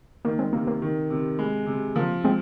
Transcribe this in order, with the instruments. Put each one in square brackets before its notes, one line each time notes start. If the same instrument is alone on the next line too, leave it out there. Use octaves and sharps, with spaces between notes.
[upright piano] D#3 [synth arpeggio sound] A#3
[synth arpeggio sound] G#3 C4
[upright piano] C3 [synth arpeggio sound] A#3
[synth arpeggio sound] A#3
[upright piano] D#3
C3
G#3
C3
[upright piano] F3 [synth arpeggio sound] A#3
[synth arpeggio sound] G#3 C4